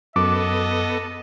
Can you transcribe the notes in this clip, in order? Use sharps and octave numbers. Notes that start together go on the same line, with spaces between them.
F#2 B3 A4 D#5 D6